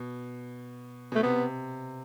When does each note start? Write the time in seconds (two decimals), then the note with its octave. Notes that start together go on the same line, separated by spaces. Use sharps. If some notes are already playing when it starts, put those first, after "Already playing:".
Already playing: B2
1.12 B2 A3
1.23 C3 B3